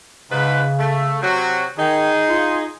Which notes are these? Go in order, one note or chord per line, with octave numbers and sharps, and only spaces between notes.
G#2 C#3 B4
A3
C3 F#3 F#4
D#3 D#4 G#4
F4